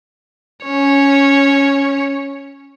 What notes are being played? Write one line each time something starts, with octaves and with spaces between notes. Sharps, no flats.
C#4 C#5